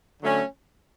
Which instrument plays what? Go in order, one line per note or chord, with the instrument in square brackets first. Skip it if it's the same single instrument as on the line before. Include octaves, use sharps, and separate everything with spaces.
[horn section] D3 F#3 A3 C#4